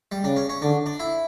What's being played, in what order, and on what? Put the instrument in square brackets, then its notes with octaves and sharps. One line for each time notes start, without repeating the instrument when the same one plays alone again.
[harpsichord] G3
[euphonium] C#3 [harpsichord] D4
[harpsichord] C#4
C#4
[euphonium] D3 [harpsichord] D4
[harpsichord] D4
E4